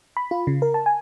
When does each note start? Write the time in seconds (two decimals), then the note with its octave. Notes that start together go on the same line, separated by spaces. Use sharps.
0.17 B5
0.31 F4
0.47 C#3
0.62 A#4
0.74 A5
0.86 G#5